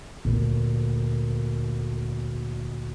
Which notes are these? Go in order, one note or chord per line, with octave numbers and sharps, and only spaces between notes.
D2 A#2